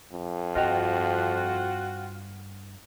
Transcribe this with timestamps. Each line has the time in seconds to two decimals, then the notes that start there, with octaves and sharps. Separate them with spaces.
0.13 F2
0.56 G2 C4 F4 F#4 D#5 G5 F7